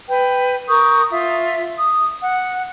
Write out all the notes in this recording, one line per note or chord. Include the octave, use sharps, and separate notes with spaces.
B4 G5
A#4 C#6 D#6 G6
F4 E5
D#6
F#5